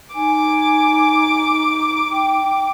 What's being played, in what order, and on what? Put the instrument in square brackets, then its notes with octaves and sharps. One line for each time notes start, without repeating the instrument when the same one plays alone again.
[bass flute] D#4 [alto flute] G#5 [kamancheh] D6
[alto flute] G5